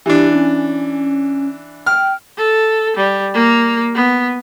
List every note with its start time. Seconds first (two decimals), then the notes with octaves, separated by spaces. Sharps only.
0.06 E3 D4 G4
0.34 C#4
1.86 G5 F6
2.38 A4
2.97 G3
3.34 A#3
3.95 B3